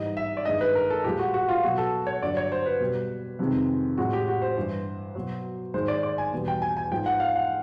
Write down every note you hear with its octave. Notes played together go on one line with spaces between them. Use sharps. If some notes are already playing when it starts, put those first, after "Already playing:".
Already playing: G#2 E3 G3 D#5
E5
D5
G2 D#3 G#3 D#5
B4
A#4
A4
A#2 F3 G#3 G4
F#4
F#4
F4
B2 F#3 F#4
A4
C#5
G2 D3 F#3 D5
C#5
C5
B4
B2 G3
F2 C3 D#3 G#3
A2 F3 G#3 F#4
G4
F#4
C5
G2 E3 G3
B2 F#3
G#2 D#3 G#3 C5
D5
D5
G#5
E2 B2 G3
G5
G#5
G#5
G#2 F3 G#3 G5
F#5
F5
F#5